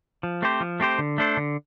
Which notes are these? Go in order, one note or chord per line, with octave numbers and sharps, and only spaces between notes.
F3
A3 C4 G4 C5
F3
A3 C4 G4 C5
D3
A3 D4 A4 C5
D3